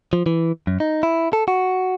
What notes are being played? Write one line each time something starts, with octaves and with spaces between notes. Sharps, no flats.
F3
E3
F#2
D#4
E4
A4
F#4